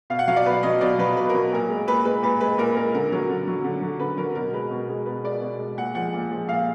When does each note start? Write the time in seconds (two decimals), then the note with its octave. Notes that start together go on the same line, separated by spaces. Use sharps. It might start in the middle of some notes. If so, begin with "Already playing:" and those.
0.10 B2 F5
0.19 F#5
0.28 F#3 F5
0.36 D5
0.45 B2 B4
0.63 F#3 D#5
0.81 B2 D5
0.99 F#3 B4
1.16 B2 B4
1.29 F#3 A#4
1.53 A#2 A#4
1.69 G#3
1.87 A#2 B4
2.05 G#3 B4
2.23 A#2 B4
2.41 G#3 B4
2.58 A#2 A#4
2.76 G#3 A#4
2.94 D3 A#4
3.12 F#3 A#4
3.29 D3
3.48 F#3
3.64 D3
3.82 F#3
4.00 D3 B4
4.18 F#3 A#4
4.35 B2 A#4
4.53 G#3 B4
4.70 B2
4.89 G#3
5.06 B2 B4
5.24 G#3 D5
5.41 B2
5.59 G#3
5.77 A#2 F#5
5.95 F3 G#3 F#5
6.13 A#2
6.31 F3 G#3
6.48 A#2 F5